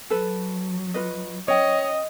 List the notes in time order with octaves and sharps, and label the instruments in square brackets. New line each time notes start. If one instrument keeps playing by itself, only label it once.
[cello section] F#3 [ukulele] A4 B4
[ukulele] F4 B4 D#5
[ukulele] C#4 G5 [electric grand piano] C#5 [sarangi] D#5